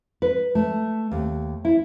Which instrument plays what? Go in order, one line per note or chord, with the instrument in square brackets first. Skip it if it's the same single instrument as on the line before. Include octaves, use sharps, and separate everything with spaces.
[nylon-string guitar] B4
A3
D#2
E4